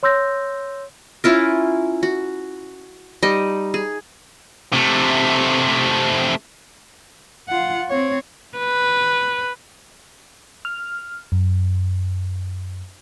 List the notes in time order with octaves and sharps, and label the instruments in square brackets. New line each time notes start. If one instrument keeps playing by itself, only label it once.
[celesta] C#5 C6 E6 G6 A#6
[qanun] C#4 E4 F4 A#4
F#4
G3 D#4 D#5
G#4
[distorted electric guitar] C3 A3
[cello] F4 F#5
C4 C#5
[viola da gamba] B4
[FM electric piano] F6
F#2